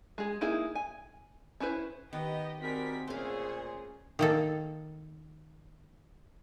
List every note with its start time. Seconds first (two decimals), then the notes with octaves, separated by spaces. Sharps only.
0.18 G#3 G#4
0.41 A#3 D#4 E4 G#4
0.75 G#5
1.60 C#4 D4 E4 B4 C5
2.13 D#3 B3 G4 D#5
2.63 G3 C4 F#4 G#4 A#4 B6
3.07 A#2 A3 C#4 G#4 C5 F5
4.19 D#3 A#3 A4